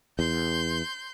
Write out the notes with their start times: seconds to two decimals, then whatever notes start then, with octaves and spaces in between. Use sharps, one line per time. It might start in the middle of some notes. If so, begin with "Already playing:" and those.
0.19 E2 C6 G6